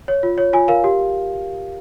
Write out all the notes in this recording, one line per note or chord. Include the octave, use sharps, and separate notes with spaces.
C#5
F4
C#5
F4 G#5
A#4 F5
G4